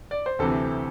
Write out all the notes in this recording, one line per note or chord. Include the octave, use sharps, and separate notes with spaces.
D5
C5
D2 C3 E3 A4